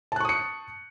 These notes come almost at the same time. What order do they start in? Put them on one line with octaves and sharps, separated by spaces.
A5 F#6 C#6 D#6 C#7